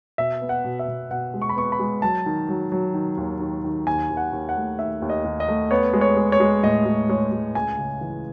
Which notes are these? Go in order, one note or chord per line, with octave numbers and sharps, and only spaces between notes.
B2 E5
B3
F#5
B2
E5
B2
B2 F#5
G#3
C#6
B5
B3 C#6
B5
G#3
F#3 A5
D#3
F#3
F#3
D#3
D#2
D#3
D#3
D#2 G#5
D#2
F#5
D#2
F#5
A3
D#3 E5
D#2
D#5
D#2
D#5
A3
B3 C#5
G#3
C#5
G#3
C#5
G#3
A2 D#5
G#3
G#3 C#5
G#3
C#2 G#5
C#3
E3